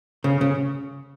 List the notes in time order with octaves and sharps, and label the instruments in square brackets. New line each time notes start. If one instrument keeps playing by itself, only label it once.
[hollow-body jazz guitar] C#3
C#3